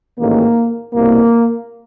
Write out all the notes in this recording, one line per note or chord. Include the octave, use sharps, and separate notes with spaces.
A1 G#2 D#3 A#3
C2 B2 A#3